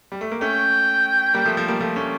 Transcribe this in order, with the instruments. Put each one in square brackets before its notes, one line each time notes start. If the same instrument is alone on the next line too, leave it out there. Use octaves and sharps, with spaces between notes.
[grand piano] G3
A3
A#3
[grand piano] A3 C#4 [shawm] G5
[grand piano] G3 A#3
F3 A3
F3 A3
G3 A#3
F3 A3
A3 C#4